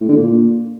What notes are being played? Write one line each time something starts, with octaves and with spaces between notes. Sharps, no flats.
A2
D3
A#2